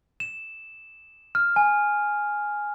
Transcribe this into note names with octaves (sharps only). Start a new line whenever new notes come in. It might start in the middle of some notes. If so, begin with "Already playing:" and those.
E7
F6
G#5